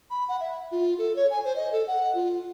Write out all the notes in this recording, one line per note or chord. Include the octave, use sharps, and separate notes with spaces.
B5
F#5
E5
F4
A4
C#5
G#5
C5
D#5
A4
F#5
F4